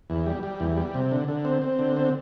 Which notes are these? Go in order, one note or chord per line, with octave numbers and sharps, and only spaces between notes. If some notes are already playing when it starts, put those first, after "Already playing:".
E2
G3
G3
E2
G3
C3
D3
D3
C4
C4
D3
C4